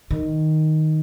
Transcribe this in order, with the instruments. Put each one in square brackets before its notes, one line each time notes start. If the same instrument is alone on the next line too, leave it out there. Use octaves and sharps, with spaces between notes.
[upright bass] D#3